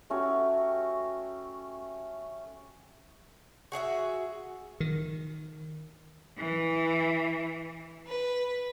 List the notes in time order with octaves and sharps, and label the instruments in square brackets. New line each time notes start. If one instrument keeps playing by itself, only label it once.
[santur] A3 C#4 F#4 G4
[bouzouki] F#4 G#4 D#5 E5
[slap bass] D#3
[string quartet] E3
B4